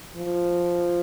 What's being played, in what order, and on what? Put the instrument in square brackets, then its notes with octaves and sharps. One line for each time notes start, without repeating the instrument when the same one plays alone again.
[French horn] F3